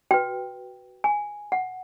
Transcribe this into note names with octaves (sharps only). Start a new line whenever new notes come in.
F#4 B4 G5
G#5
F#5